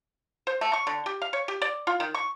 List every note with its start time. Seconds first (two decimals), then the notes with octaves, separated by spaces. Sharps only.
0.47 C5
0.61 A3
0.73 C#6
0.87 D3
1.06 G4
1.22 F5
1.33 C#5
1.48 G4
1.62 D5
1.87 F4
2.00 D#3
2.14 C#6